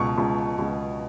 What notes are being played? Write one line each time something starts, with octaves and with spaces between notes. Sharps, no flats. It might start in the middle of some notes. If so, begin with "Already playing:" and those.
Already playing: C#2 B2 C#6
C#2
C#2